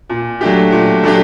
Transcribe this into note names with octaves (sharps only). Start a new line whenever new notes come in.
A#2
F#3 A3 D4 G4
A#2
F#3 A3 D4 G4